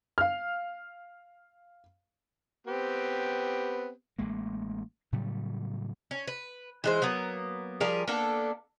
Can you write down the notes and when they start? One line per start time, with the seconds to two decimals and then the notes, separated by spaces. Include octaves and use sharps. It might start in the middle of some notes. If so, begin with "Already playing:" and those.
0.18 F5 F6
2.67 B3 C4 G4
4.19 A1 G#3 A#3
5.12 A2 C#3 F#3 G3
6.11 C#4
6.28 B4
6.84 E3 G#3 C5
7.02 F#3 A#3 B3
7.80 F3 G3 G#4 A#4
8.08 A#3 B3 D4 A4